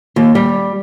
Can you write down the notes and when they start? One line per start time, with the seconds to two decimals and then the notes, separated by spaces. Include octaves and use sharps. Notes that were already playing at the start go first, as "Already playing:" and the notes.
0.16 D#2
0.35 G3